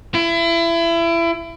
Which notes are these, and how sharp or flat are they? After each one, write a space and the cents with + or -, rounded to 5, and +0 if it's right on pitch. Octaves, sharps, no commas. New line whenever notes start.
E4 +30